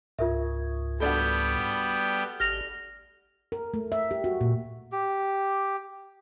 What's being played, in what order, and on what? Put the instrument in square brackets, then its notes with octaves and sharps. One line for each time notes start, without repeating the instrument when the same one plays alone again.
[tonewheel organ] C#2 G#2 [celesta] F4 A#4 E5
[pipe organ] G3 B3 G5 [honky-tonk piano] A3 D4 F#4
[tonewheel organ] G#1 G4 [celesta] F6 A#6 F7
[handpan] A#4
A3
E5
G4
F#4
A#2
[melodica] G4